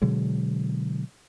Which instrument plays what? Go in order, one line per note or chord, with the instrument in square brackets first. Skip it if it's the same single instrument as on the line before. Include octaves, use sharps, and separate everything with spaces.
[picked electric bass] B2 D3 F#3 G#3